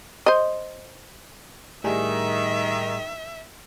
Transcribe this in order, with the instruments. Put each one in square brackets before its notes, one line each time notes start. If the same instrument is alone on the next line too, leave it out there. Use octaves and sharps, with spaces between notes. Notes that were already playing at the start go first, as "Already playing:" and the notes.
[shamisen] C5 D#5
[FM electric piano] A2 G3 G#4 [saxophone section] D#3 [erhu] E5